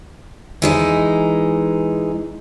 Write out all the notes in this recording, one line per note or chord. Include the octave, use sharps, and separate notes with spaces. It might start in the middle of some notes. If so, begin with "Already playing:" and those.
E3 G#3 D#4